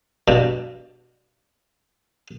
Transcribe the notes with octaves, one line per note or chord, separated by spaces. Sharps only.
G2 B2